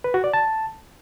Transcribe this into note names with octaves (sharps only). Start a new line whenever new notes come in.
B4
F#4
D5
A5